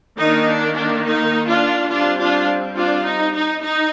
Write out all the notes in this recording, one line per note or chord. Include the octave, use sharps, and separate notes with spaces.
D#3 A#3 D4 D#4
D4
D4
D#4
D4 F4
G3 C4 D4 F4
D4 F4
D4 F4
D#4
D#4
D#4